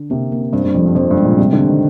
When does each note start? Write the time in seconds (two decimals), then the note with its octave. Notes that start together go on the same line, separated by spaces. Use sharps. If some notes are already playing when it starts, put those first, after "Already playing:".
Already playing: D3
0.10 C3 A#3
0.32 A#3
0.53 G2 C4
0.64 G2
0.74 F2 F3
0.86 G2
0.95 F2 C4
1.11 G2
1.17 C3 G#3
1.25 A#2
1.38 C3 G3
1.53 D3
1.60 C4
1.67 D#3